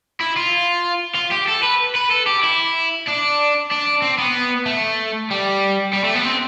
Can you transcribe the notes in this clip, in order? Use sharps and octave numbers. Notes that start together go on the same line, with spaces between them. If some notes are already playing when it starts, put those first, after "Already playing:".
E4
F4
F4
G4
A4
B4
B4
A4
G4
E4
D4
D4
C4
B3
A3
G3
G3
A3
B3
C4